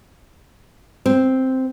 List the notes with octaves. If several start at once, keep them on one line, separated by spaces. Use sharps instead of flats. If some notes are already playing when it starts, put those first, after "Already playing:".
C4